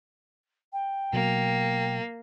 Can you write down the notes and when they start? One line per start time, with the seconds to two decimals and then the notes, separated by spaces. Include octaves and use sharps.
0.72 G5
1.13 B2 F#3 A#3